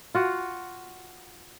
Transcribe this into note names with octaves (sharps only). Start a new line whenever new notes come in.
F4 F#4